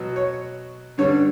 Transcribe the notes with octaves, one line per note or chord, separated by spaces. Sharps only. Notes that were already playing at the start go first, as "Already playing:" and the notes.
Already playing: B2 F#3
C#5
G2 D3 G3 C#5